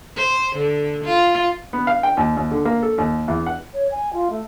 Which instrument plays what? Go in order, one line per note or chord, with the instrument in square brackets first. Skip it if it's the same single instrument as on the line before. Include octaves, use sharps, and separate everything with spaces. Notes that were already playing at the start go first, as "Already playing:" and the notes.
[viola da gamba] C5
D3
F4
[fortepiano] B3
F5
G5
D#2
D#2
D3
A#3
A4
D#2
E2
F#5
[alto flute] C#5
G#5
F4
A3